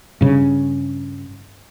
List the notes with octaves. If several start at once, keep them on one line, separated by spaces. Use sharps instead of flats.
G2 C#3